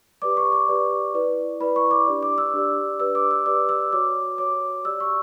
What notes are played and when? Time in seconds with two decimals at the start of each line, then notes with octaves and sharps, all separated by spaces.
0.22 G4 B4 D5 D6
0.37 C#6
0.52 D6
0.68 G4 B4 D5
1.14 E4 B4 D5
1.60 E4 B4 D5 B5
1.76 C#6
1.91 D6
2.07 D4 G4 D5
2.23 D6
2.38 E6
2.54 D4 G4 D5
2.99 G4 B4 D5 E6
3.15 D6
3.31 E6
3.46 G4 B4 D5 D6
3.69 E6
3.92 F#4 C#5 D6
4.38 F#4 C#5 D6
4.85 G4 D5 E6
5.00 C#6